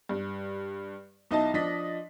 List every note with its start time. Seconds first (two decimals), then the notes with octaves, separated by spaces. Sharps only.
0.09 G2
1.31 B1 D#4 E4 D#5 A5
1.54 F3 D4 D#5 B6